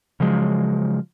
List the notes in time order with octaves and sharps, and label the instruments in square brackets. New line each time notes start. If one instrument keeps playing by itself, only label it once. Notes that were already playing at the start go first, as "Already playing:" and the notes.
[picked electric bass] C#3 F3 F#3 G#3